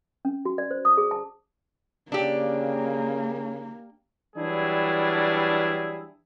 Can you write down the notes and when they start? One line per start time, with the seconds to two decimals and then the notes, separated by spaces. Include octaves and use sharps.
0.25 C#4
0.45 F#4
0.58 D5
0.71 C5
0.85 D#6
0.97 G#4
1.11 A5
2.12 C#3 A#3 D4 G4
4.36 E3 F#3 G3 D4 E4 G#4